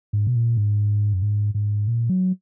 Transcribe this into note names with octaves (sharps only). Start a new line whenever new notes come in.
G#2
B2
A#2
G#2
F#2
G#2
G#2
A#2
F#3